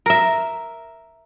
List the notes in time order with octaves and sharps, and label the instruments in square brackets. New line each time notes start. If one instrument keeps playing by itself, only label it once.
[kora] A#4 E5